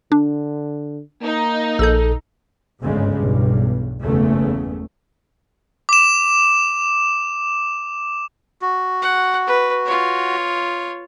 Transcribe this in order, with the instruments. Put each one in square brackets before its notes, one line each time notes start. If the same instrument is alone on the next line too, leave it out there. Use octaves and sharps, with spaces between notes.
[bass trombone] D3 [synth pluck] D4
[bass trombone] A#3 [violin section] D#4
[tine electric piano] A#1 A4 [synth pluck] E6 G6
[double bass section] G1 D2 G#2 C#3 G#3
B1 E2 G2
F#1 E2 C#3 A3
[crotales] D6 E7
[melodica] F#4
[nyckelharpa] F#5
B4
F4 C#5